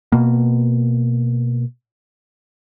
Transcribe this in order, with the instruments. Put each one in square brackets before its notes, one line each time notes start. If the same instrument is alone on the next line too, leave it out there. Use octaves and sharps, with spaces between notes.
[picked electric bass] B2 A#3